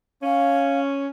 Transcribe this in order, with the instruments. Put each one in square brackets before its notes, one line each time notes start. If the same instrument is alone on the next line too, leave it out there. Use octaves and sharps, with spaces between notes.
[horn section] C#4 [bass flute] F5